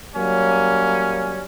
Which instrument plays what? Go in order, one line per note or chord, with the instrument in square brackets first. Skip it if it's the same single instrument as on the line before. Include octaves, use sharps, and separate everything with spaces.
[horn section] F#3 G3 A#3 C#4